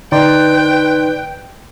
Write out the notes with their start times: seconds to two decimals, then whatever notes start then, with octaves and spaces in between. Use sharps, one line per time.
0.12 D3 D#4 B4 D5 G5 C6